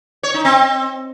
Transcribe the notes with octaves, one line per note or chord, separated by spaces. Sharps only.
C#5
D#4
C4